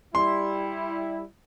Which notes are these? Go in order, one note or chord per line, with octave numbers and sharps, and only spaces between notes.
G3 E4 C6